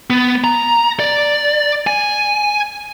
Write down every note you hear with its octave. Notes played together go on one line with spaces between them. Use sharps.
B3
A#5
D5
G#5